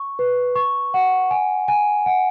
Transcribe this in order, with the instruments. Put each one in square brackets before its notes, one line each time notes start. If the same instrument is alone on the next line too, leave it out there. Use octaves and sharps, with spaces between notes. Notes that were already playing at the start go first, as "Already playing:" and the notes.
Already playing: [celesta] C#6
B4
C#6
F#5
G#5
G#5
F#5